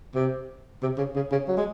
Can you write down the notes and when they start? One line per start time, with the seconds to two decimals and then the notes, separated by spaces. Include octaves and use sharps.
0.15 C3
0.82 C3
0.98 C#3
1.16 C#3
1.32 C#3
1.48 F#3
1.57 G#3